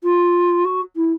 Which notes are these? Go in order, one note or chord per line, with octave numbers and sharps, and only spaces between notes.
F4
F#4
E4